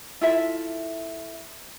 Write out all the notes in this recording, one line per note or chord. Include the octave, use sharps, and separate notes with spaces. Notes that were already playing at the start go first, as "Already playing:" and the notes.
E4 F4 A4 E5